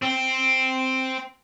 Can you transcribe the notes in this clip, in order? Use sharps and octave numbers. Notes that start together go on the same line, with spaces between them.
C4